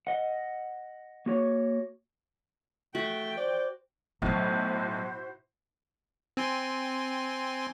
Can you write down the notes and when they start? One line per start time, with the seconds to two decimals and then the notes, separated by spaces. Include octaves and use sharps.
0.07 D#5 F#5
1.26 A#3 F#4 C#5
2.95 A3 F#4 G5
3.37 C5 D5
4.22 B1 A2 F#3 A3 E4 F#4 C5
6.37 C4 G#5 C6